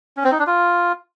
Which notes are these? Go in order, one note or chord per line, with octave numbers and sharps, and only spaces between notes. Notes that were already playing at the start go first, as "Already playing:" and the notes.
C#4
C4
D#4
D4
F4